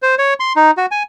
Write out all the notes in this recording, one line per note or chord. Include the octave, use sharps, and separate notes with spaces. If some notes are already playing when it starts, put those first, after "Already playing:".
C5
C#5
C6
D#4
F#4
G#5